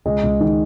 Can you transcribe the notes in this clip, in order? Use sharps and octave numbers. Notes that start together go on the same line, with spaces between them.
C#2 G#3
C#2
D#3